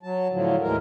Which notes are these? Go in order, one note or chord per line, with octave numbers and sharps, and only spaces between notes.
F#3 A5
A2 D3 F3 F#3
D#2 A2 E3 G#3 A#4